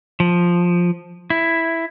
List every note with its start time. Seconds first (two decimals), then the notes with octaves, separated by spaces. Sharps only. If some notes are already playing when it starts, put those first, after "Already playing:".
0.20 F3
1.30 E4